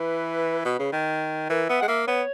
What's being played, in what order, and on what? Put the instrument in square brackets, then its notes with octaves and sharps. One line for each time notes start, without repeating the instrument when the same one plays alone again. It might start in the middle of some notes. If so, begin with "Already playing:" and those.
Already playing: [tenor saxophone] E3 [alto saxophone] B4
[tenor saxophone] B2
C#3
D#3
[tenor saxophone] E3 [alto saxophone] A#4
[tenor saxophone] B3 [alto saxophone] E5
[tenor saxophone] G#3 [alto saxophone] F#5
[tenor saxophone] A#3 [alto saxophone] E5
[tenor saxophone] B3 [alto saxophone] C#5